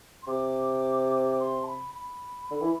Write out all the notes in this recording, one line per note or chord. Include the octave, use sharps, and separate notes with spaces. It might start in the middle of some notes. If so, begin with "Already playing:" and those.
C6
C3 D6
D6
C6
A5
B5
B5
D3
E3